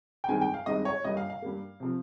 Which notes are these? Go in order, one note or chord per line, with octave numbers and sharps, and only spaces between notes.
G5
G2 D#3 G#3 C4 G#5
G5
F5
G2 D#3 G#3 C4 D#5
C#5
G2 G3 A#3 D#5
F5
F5
G2 G3 A#3
C3 F3 C4